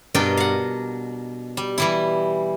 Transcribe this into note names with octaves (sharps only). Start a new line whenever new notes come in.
G2 B2 D4 A#4 D#5 G5
F5 F#5
G3
E3 G3 E4